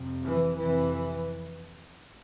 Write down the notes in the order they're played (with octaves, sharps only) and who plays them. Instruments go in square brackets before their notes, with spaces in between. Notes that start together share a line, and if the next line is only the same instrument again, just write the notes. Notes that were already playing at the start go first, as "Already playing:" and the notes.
Already playing: [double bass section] F2 C3
E3
F2 C3 E3